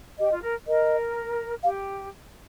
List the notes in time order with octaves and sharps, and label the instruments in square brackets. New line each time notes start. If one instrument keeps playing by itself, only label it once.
[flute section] G4 [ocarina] D#5
[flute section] F4
A#4
[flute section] A#4 [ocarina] D#5
[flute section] G4 [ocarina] F5